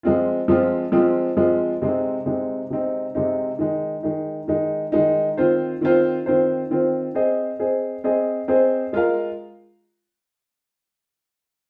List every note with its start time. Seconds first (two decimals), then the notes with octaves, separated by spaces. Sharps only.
0.03 F3 G#3 C4 F4
0.48 F3 G#3 C4 F4
0.92 F3 G#3 C4 F4
1.37 F3 G#3 C4 F4
1.82 C3 G#3 C4 D#4
2.25 C3 G#3 C4 D#4
2.70 C3 G#3 C4 D#4
3.15 C3 G#3 C4 D#4
3.59 D#3 G#3 D#4
4.03 D#3 G#3 D#4
4.48 D#3 G#3 D#4
4.92 D#3 G#3 D#4
5.37 D#3 C4 F4 C5
5.81 D#3 C4 F4 C5
6.26 D#3 C4 F4 C5
6.71 D#3 C4 F4 C5
7.15 C4 G#4 C5 D#5
7.59 C4 G#4 C5 D#5
8.04 C4 G#4 C5 D#5
8.48 C4 G#4 C5 D#5
8.93 G#3 F4 A#4 F5